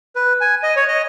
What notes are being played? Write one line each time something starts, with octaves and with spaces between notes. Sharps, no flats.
B4
G#5
D#5
C#5
D#5